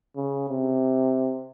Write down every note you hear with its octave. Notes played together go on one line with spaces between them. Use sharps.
C#3
C3